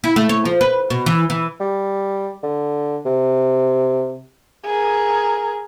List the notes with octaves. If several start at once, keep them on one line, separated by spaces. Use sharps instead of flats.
E4
A3
C#5
F3
B4
B2
E3
E3
G3
D3
C3
G#4 A#4